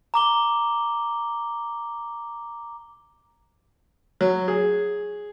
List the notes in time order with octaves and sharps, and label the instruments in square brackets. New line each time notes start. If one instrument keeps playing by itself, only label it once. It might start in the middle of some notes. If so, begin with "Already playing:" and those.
[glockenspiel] A#5 D6 G7
[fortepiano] F#3
G#4